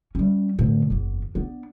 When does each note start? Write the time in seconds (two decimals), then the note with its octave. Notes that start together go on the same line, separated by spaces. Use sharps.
0.15 G3 C#4
0.58 A2 D3
0.90 F#1 E2
1.35 B3 D4